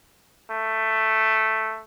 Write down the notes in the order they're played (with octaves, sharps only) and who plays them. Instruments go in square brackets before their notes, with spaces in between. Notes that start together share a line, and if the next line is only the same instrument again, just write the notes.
[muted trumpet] A3